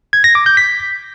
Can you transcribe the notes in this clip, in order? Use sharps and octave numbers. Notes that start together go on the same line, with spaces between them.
G#6
A#6
D6
G6
B6